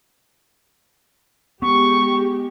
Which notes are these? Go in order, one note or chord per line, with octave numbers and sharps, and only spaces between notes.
G#3 B3 G4 C#6